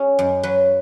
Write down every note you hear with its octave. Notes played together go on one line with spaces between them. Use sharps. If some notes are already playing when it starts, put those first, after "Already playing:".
Already playing: C#4 G#4
F#2
F#3 B4